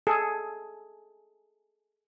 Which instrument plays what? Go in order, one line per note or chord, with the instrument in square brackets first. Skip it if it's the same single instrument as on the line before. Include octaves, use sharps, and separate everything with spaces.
[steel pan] G#4 A4